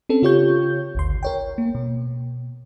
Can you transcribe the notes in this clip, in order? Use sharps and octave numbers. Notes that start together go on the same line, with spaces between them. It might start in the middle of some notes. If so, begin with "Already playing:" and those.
C4 C#4 A4
C#3 F4 G4 C#5 C#6 G6
G#1 D2 C6
A#4 C#5 G5
A#3
B2